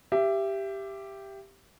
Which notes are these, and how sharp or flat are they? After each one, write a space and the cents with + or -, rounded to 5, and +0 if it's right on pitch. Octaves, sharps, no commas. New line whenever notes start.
G4 +0 E5 +25